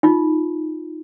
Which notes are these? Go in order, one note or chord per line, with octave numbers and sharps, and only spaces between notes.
D#4 F4